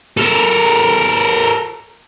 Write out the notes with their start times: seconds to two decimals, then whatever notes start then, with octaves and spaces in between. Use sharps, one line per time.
0.17 A4 A#4